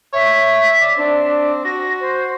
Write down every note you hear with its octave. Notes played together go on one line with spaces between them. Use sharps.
C#5 E5
D5
C4 D4
F#4 A#6
C5